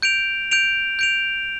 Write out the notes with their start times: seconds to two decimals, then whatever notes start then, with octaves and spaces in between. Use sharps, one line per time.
0.02 G6 D7 F7
0.51 G6 D7 F7
0.99 G6 D7 F7